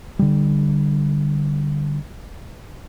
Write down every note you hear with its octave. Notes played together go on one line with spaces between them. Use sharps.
D3 G3